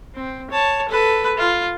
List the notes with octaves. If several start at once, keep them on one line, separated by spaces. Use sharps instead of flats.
C4
C#5 A5
A4 B4
F4